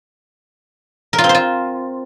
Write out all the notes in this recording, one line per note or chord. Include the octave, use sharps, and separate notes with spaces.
A#4
F4
C4
C5
F4